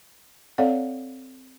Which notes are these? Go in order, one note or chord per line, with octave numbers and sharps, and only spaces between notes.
C4 A4 C#5 D5 F5 F#5